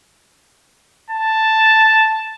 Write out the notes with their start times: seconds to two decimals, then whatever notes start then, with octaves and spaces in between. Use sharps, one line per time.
1.10 A5